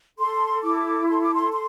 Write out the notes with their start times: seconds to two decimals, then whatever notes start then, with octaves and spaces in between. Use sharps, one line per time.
0.19 A4 C6
0.63 E4 D6
1.08 A4 C6
1.21 D6
1.33 C6
1.52 C6